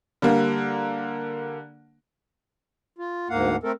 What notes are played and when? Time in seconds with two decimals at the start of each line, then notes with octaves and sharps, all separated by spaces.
0.22 D3 G3 A#3
2.98 F4
3.29 D2 G#2 A#3 F5 F#5
3.63 A3 C4 A4 A#4